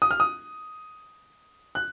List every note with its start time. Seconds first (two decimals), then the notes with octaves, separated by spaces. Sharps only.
0.02 D#6
0.11 F6
0.20 D#6
1.75 F#6